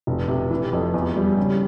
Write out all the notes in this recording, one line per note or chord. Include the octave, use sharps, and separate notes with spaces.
F1
C3
E3
F2
E2
G3
C#3